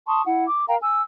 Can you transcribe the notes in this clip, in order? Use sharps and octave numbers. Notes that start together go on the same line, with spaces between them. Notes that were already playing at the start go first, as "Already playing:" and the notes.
A5 C6 C#6 D#6
E4 F#5
D6
A#4 F5 G5 A#5
G#5 E6